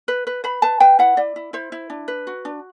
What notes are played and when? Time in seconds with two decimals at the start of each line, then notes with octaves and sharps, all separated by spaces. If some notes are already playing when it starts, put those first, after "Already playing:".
0.08 B4
0.27 B4
0.44 B4 B5
0.62 B4 A5
0.80 B4 G5
0.99 E4 F#5
1.17 E4 D5
1.36 E4
1.53 E4 C5
1.72 E4
1.90 D4
2.08 B4
2.27 F#4
2.45 D4